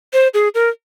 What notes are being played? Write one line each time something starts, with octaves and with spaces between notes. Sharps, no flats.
C5
G#4
A#4